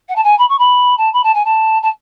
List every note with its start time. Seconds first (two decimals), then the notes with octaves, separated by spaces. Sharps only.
0.08 F#5
0.15 A5
0.23 G#5
0.38 B5
0.48 C#6
0.58 B5
0.97 A5
1.13 B5
1.23 A5
1.34 G#5
1.44 A5
1.82 A5